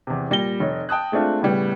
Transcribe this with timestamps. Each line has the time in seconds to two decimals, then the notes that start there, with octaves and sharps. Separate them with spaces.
0.07 E2 C3
0.30 A#2 G3 A#6 G7
0.60 F1 C#5
0.89 G5 A5 D#6 F#6
1.12 G#3 A3 C4 D4 F4
1.41 A2 C#3 G3 B3